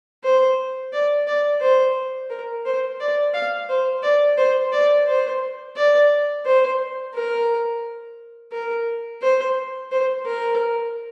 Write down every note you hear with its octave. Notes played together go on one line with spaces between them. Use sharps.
C5
D5
D5
C5
A#4
C5
D5
F5
C5
D5
C5
D5
C5
D5
C5
A#4
A#4
C5
C5
A#4